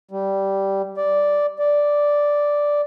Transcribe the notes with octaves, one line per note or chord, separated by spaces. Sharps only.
G3
D5
D5